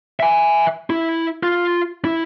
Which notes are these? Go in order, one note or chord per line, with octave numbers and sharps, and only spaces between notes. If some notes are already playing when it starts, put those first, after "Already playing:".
E5 G#5
E4
F4
E4